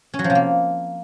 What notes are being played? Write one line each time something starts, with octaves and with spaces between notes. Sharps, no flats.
C#4
F#3
F3
C3
A#3